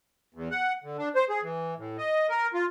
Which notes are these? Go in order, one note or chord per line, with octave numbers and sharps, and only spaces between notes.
E2
F#5
D3
D4
C5
G#4
E3
A2
D#5
A#4
F4